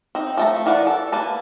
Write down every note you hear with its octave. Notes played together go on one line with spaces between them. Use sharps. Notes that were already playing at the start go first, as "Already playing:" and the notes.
C4 D#4
F3 A3 A#5
E3 A#4 D5 F#5
A4
A#3 B4 A5